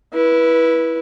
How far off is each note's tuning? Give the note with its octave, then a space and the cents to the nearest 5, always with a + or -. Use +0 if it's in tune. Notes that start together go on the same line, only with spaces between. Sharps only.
E4 +0 B4 -20